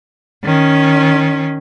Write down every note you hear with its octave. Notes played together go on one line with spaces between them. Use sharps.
D#3 C#4